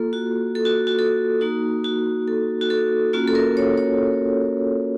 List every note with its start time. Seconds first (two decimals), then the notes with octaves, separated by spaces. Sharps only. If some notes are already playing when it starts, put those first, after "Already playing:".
Already playing: A#3 F4 A4
0.13 F#4
0.55 A4
0.65 F#4
0.87 F#4
0.99 A4
1.41 A#3 D#4 F#4
1.84 F#4
2.28 A4
2.61 F#4
2.70 A4
3.13 A#3 C#4 F4 F#4
3.28 A4
3.35 A#4
3.57 C#5
3.78 C#5